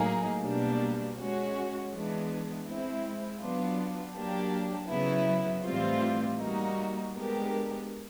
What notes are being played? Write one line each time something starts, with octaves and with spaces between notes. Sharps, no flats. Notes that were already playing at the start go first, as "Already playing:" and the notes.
Already playing: A2 F#3 A#3 D#4 G#4
B2 G3 A#3 D4
G#3 C#4 F#4
E3 G#3 B3 D4
G#3 C4 E4
F#3 B3 D4 F4
F#3 A#3 D4 G4
C#3 F#3 B3 E4
A2 E3 G3 C4 F4
G3 A#3 D#4 F#4
G#3 B3 D4 G4 A#4